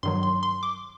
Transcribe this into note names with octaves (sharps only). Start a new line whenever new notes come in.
G2 D#3 F#3 C6
C6
C6
D6